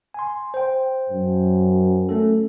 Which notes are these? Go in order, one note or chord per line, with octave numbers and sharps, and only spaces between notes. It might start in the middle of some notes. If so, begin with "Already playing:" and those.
G#5 C6
C5 G5
F#2
A3 C#4 A4